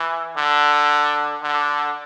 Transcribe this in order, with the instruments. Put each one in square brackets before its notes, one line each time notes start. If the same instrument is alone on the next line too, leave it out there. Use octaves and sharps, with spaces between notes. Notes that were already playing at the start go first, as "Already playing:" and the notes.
Already playing: [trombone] E3
D3
D3